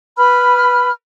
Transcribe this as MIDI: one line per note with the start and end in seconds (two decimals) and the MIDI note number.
0.18 0.90 71
0.18 0.90 83
0.18 0.90 89